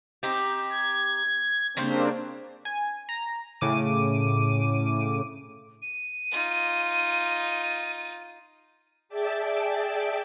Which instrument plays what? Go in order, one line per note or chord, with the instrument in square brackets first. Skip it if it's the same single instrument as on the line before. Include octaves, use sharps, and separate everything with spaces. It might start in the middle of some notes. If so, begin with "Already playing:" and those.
[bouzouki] C4 D#4 G4
[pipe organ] G#6
[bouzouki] C#3 G3 C5 [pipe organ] A#3 C4 D4
[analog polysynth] G#5
A#5
A2 C#3 D6 D#7
[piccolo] D#7
[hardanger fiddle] D#4 F4
[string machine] G#4 D5 E5 G5 A5 D6